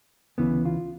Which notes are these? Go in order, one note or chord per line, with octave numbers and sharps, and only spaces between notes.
D2 C#3 E3 B3
F4